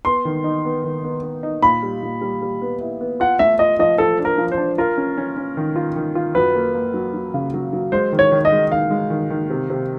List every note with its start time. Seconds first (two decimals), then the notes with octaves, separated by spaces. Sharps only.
0.05 B3 C6
0.25 D#3
0.44 D#4
0.65 B3
0.84 D#3
1.04 B3
1.23 B3
1.43 D#4
1.62 A#2 B5
1.83 G3
2.03 A#2
2.22 G3
2.42 G3
2.62 B3
2.81 E4
3.01 B3
3.20 F4 F#5
3.39 A3 E5
3.59 F4 D#5
3.79 F3 D#5
3.98 F3 A4
4.19 D4
4.25 A#4
4.38 F3
4.52 C5
4.58 D4
4.78 F4 A#4
4.97 C#4
5.17 C#4
5.37 C#4
5.57 D#3
5.76 F4
5.96 D#3
6.15 F4
6.35 F#2 B4
6.55 A#3
6.75 A#3
6.94 F#3
7.14 F#3
7.34 C#3
7.54 F#3
7.73 F#3
7.92 G#3 C5
8.13 D#3
8.19 C#5
8.32 D#3
8.45 D#5
8.52 G#3
8.71 D#3 F5
8.91 G#3
9.10 D#3
9.30 D#3
9.50 C3
9.70 C3